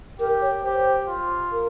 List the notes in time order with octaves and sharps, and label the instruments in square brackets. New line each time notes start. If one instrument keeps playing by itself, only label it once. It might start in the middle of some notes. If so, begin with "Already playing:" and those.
[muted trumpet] G4 [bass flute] A#4
[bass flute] C#5
[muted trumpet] G4 [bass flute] C5
[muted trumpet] F4
[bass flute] A#4